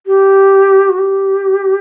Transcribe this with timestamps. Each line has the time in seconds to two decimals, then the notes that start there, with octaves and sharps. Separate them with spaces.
0.06 G4
0.89 F#4
0.98 G4